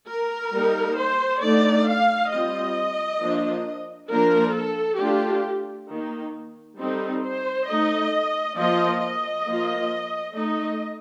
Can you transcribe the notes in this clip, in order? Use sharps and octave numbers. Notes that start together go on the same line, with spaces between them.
A#4
G3 A#3 D#4
C5
D3 A3 D#4 D5
F5
G3 C4 F4 D#5
F3 A#3 D4
F3 A#3 D4 A#4
A4
A3 D4 F4 G4
D#3 A#3 D#4
G3 C4 D#4 A4
C5
A3 D#4 D#5
F3 A#3 F4 D#5
D#5
F3 A#3 F4
A3 D#4 D#5